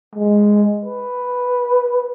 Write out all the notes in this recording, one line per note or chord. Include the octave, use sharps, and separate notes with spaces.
G#3
B4